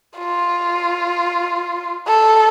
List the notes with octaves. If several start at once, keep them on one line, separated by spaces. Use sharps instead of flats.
F4
A4